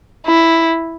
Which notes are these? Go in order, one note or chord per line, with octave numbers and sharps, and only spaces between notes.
E4